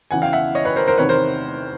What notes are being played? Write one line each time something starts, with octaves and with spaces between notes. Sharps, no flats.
E2 C#3 E3 F#5 G#5
F5 G5
E5 F#5
C#5 D#5
B4 C#5
A#4 C5
A#4 C5
E2 C3 D#3 B4 C#5
A#4 C5